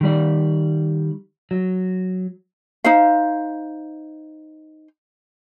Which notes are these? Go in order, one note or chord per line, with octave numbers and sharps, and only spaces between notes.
D#3 G3 D5
F#3
D#4 C5 F5